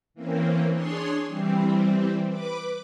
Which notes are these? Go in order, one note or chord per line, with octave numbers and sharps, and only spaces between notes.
E3 A#3 C4 C#4
D4 G#4 C#5 C6
E3 G3 C4
B4 D6